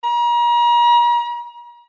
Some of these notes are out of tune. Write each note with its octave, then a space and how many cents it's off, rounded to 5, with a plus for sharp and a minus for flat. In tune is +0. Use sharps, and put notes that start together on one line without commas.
A#5 +40